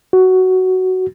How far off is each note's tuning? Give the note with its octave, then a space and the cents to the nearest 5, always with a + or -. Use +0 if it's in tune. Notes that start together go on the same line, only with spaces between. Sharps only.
F#4 +10